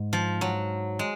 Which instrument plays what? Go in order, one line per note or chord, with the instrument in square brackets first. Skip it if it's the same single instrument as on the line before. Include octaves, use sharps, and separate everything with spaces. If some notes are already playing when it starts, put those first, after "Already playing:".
Already playing: [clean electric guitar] G#2
[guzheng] F3
F#3
G#3